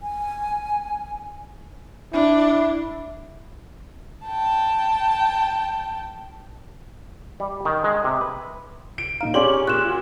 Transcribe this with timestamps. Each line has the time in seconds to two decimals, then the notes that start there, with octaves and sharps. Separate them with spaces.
0.01 G#5
2.13 D4 E4
4.26 G5 A5
7.40 G3
7.65 D#3
7.84 G#3
8.04 C3
8.21 B4
8.98 C2 D7
9.21 A#2 D#4 F5 A#5
9.34 C#4 G4 G#4 C#5 D5 C6 D6 F#7
9.54 C#6
9.67 A#2 F#6 E7
9.85 F4 F#4